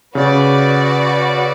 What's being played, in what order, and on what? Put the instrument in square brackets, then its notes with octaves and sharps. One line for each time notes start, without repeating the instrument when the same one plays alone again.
[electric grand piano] C#3 [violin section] F#4 B4 D5